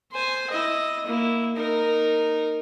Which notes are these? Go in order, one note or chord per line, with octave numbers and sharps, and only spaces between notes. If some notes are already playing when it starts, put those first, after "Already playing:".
C5 G#5
E4 D#5
A#3 E4
D#4 A#4